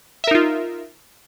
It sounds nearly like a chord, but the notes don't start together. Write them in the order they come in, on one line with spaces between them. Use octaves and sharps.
E5 A#4 D#4 F4